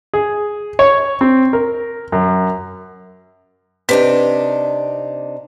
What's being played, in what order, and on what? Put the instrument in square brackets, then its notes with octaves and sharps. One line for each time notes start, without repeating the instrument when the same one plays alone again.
[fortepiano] G#4
C#5
C4
A#4
F#2
[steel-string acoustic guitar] C3 D4 D#4 [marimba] B4